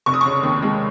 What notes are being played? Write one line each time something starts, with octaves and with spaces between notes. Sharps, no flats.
F1 C#6
D#6
C#3 C#6
D#2
G#3